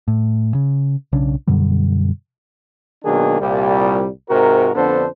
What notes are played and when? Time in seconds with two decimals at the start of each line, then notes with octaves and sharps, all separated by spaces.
0.08 A2
0.55 C#3
1.12 B1 C#3 C#4 D4
1.47 F#2 B2 D3 G3
3.04 B2 D#3 F#3 A#3 D4 G#4
3.40 C2 A#2 G3
4.29 G#2 C3 F#4 A#4
4.75 F2 D3 B3 D4 A4 C5